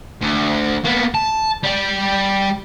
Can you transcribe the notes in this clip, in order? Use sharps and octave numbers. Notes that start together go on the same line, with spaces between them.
D2
A#3 B3
A5
G3 D5